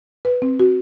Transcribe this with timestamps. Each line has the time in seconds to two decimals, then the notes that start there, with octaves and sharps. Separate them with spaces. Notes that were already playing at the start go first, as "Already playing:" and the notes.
0.25 B4
0.42 C4
0.60 F#4